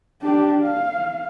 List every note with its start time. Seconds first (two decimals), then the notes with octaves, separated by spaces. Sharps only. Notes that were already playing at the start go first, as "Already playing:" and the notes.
0.22 D4 G4
0.63 F5